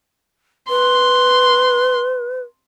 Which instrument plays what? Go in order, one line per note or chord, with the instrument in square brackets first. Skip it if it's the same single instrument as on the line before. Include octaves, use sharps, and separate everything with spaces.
[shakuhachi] B4 [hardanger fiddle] C6